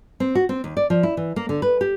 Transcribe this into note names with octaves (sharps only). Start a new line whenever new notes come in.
C4
F#4
C4
D#2
D5
F3
E4
E3
A#3
D3
B4
G4